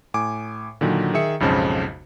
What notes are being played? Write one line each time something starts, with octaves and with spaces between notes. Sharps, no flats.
A2 G#5 D6
A#2 D3 D#3 F#3
D#3 G#4 E5 C#7
B1 F2 G#2 C#3 C5 A5